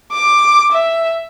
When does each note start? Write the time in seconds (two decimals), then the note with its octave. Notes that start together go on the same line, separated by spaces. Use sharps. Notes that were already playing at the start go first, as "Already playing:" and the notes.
0.13 D6
0.72 E5